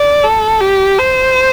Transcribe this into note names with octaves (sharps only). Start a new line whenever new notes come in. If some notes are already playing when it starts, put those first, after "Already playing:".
Already playing: D5
A4
G4
C5